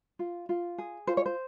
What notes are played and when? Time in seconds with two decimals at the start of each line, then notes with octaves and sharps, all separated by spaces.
0.19 F4
0.49 F4
0.78 G#4
1.07 F4 C5
1.17 C#5
1.26 C5